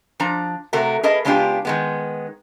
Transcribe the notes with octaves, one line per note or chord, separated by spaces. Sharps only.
F3 D4 A#5
C3 A3 F#4 A#4
G#4 A#4 B4 D#5 A5
C#3 G#3 B3 D4 F4 G4
D#3 G#3 B3